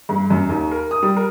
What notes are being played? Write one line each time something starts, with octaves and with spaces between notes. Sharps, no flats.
G2
F#2
D#2
A#4
D#6
G3
A#4